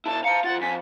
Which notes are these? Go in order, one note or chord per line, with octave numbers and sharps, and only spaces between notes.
B2 E4 A5
F5 A5 A#5 C#7
F2 F4 F#5 A6
F2 G#5 B6